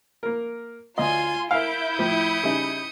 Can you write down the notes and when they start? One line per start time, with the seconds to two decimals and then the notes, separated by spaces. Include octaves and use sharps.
0.23 A#3 A#4
0.98 D2 F4 D#5 G#5 C6
1.51 E4 A#4 E5 F5 G6 D7
1.99 A2 F3 D#6 C#7
2.43 C#3 G3 D#4